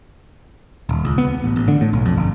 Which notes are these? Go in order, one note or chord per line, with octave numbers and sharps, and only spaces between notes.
D#1
C#2
B3
A1
A1
D3
A2
B1
F2
G1